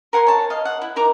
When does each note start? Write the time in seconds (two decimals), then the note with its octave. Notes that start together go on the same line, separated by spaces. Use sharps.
0.13 A#4 F#5 G#5 C6
0.26 C#5 A5
0.50 D#5 F5
0.65 F#5
0.82 E4
0.96 D#4 A#4 A#5 D6